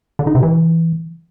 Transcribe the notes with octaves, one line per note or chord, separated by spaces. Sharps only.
D3
D#4
C3
E3